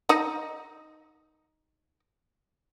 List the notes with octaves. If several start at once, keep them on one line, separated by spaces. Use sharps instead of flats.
D#4 D#5